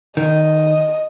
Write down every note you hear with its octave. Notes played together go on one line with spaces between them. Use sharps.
D#3 D#5